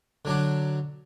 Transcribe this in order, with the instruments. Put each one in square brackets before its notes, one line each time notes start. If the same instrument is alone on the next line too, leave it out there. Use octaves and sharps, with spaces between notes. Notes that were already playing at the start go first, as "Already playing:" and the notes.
[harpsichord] D3 F#3 D4